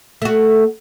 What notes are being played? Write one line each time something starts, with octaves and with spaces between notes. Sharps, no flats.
A3 F#4